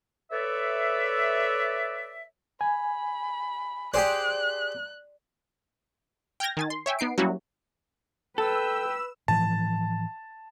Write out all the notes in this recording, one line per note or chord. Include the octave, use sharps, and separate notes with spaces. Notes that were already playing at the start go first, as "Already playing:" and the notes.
A4 B4 C#5 D5 E5
G#5 B5
G4 G#4 C5 D5 F#6
G5 F6 G6 G#6 A#6
D#3 G#5 A6
C6
C#5 E5 G5 G#5
B3 D#4 C7 D7
F#3 G3 A#3 C#4 E4 F#4
A4 B4 G5 E6
A2 E3 F3 A5